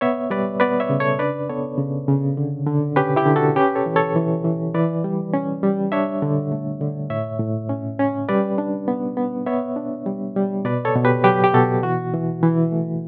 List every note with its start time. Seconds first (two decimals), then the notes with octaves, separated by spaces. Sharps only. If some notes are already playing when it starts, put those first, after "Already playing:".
0.01 B3 C#5 E5
0.30 G3 B4 D5
0.60 B3 B4 D5
0.80 C#5 E5
0.90 C#3
1.00 A4 C#5
1.19 D4 B4 D5
1.49 B3 A4 C#5
1.78 C#3
2.08 C#3
2.37 D3
2.67 D3
2.96 C#4 G4 B4
3.16 E4 G4
3.26 D3
3.36 F#4 A4
3.56 C#4 G4 B4
3.75 A4 C#5
3.86 E3
3.96 A4 C#5
4.16 E3
4.45 E3
4.74 E3 B4 D5
5.04 G3
5.34 C#4
5.63 G3
5.92 D4 C#5 E5
6.22 D3
6.52 A3
6.81 D3
7.10 A2 C#5 E5
7.40 A2
7.70 C#4
7.99 C#4
8.29 G3 B4 D5
8.58 D4
8.88 B3
9.17 B3
9.46 B3 C#5 E5
9.76 D4
10.06 G3
10.36 G3
10.65 B2 B4 D5
10.85 A4 C#5
10.95 B2
11.05 G4 B4
11.24 F#3 G4 B4
11.44 G4
11.54 B2 F#4 A4
11.83 E3 F#4
12.14 E3
12.43 E3
12.72 A3